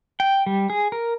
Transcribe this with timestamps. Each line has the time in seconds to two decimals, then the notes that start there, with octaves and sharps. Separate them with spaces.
0.20 G5
0.46 G3
0.70 G#4
0.92 A#4